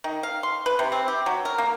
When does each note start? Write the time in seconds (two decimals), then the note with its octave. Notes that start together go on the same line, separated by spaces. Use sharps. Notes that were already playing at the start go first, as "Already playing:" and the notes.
0.04 D#3
0.23 F5
0.43 C6
0.66 B4
0.79 C3
0.92 C4
1.08 G4
1.26 F#3
1.45 A#4
1.58 A#3